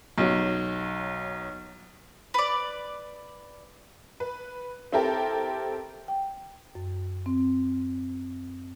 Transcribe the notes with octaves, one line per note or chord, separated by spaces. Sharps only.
B1 F#3
B4 D5
B4
C4 E4 G4 A4 A#4 G5
G5
F#2
C4